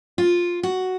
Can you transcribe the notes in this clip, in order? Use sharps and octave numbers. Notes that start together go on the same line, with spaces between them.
F4
F#4